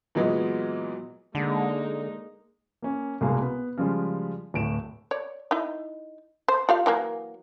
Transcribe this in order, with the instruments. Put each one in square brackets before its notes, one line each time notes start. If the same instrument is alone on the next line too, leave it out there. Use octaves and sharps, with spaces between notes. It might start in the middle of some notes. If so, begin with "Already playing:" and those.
[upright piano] A#2 E3 F#3 G#3 B3
[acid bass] D3 [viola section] G#3 A#3 D#4
[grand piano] A#3 C#4
C2 B2 G#3 A#3 G#4 F5
B3
C#3 F3 G3 G#3
D1 A2 D7 E7
[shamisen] C#5 D5
D#4 E4
C5
F4 G4 F5
E3 F#3 A#3